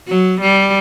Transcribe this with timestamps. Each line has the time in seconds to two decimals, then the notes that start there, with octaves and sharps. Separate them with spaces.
0.08 F#3
0.41 G3